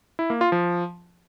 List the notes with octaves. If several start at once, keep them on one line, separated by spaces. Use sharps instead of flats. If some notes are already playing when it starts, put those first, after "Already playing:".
E4
A#3
F4
F3